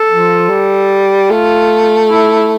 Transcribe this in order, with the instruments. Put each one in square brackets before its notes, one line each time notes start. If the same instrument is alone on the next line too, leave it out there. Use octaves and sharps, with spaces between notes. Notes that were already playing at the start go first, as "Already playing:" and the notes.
Already playing: [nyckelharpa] A4
[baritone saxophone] F3
G3
[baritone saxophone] A3 [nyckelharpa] F4
[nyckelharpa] E4